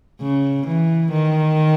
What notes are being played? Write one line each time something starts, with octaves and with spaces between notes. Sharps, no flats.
C#3
E3
D#3